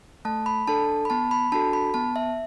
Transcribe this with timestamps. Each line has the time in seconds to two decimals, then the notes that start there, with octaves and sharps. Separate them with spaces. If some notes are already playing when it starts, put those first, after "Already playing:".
0.25 A3 A5
0.46 B5
0.67 D4 A4 A5
1.05 B5
1.10 B3 A5
1.31 B5
1.52 D4 F#4 A4 A5
1.73 B5
1.94 B3 A5
2.16 E5